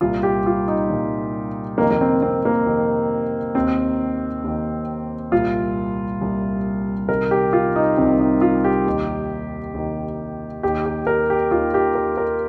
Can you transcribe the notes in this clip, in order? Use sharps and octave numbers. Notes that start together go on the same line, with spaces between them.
C2 A#2 F4
G4
F4
D#4
C2 A#2
F2 C3 D#3 A#3
A#3
C4
C4
A#3
F2 C3 D#3
D#2 D#3 C4
D#2 D#3
C2 A#2 F4
C2 A#2
C2 C3 D#3 A#4
G4
F4
D#4
C2 C3 D#3 C4
D#4
F4
G4
D#2 D#3
D#2 D#3
D#2 D#3 G4
G4
A#4
G4
D#2 D#3 F4
G4
A#4
A#4